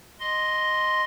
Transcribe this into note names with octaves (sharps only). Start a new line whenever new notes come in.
D#5 C6